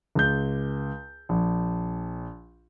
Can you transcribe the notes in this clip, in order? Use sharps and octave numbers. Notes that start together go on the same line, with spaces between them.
C#2 G6
A#1